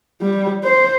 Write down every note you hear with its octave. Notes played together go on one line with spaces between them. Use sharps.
G3
C5